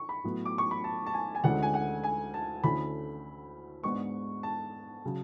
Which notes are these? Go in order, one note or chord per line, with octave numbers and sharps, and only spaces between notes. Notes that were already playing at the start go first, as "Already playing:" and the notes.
Already playing: C#6
B5
A2 F#3 B3
D6
C#6
B5
A5
A5
G#5
G#5
D2 D3 G#3 C#4 E4 F#5
G#5
F#5
G#5
A5
D2 D3 A3 C#4 E4 B5
G#2 G#3 B3 D4 C#6
A5
C#3 F#3